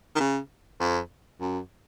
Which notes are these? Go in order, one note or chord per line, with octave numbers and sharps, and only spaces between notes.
D#3
C#3
F2
F#2